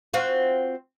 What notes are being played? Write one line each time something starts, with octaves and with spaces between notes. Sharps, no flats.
C4 F4 F#4